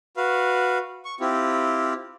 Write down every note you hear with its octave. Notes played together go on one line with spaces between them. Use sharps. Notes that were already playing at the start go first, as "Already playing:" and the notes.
F#4 B4 F5
C#6
C4 E4 F4 G4